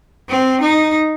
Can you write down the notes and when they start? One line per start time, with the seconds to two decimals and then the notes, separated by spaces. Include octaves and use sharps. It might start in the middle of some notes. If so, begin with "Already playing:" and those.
0.29 C4
0.61 D#4